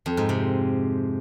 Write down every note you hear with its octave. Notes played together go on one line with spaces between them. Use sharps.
F2
G#2
C3